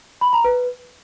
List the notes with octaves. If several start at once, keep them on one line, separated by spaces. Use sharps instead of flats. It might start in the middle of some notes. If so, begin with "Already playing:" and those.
B5
A#5
B4